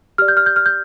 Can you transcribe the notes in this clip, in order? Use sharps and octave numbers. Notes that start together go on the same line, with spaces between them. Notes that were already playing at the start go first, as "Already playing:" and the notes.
G4 D5 F6
G6
F6
G6
F6
G6